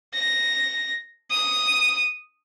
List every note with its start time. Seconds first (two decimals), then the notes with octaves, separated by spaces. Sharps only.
0.14 A#6
1.31 D#6